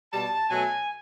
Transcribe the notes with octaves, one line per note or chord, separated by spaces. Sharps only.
B2 G3 A5
B2 F#3 A3 G#5